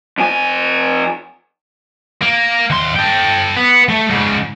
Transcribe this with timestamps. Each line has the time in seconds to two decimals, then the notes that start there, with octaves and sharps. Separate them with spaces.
0.18 F2 G#5
2.22 A#3
2.70 D#2 C6
2.96 A4 G5
3.57 B3
3.89 A3
4.10 G#2 C#3